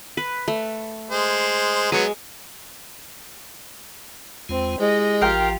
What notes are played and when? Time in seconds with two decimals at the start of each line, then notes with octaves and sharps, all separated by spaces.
0.17 B4
0.48 A3
1.11 G#3 C5
1.92 F#3 G#3 B3 C#6
4.49 E2 G#3 C4 F4
4.80 G#3 E4 G4 D#5
5.22 A1 F3 F4 G4 A#4 G5